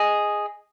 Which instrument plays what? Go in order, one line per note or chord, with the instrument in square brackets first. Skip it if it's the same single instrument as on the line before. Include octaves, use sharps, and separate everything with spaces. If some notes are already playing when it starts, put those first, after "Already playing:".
Already playing: [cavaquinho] G#4 D#5